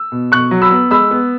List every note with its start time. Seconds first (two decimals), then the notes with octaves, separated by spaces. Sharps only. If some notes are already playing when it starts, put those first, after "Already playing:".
Already playing: E6
0.12 B2
0.32 B2 C#6 F#6
0.51 F#3
0.62 B5 E6
0.71 B3
0.91 G#3 B5 E6
1.11 B3